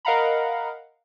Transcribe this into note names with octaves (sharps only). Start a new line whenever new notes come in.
A#4 D#5 F5 F#5 A#5 B5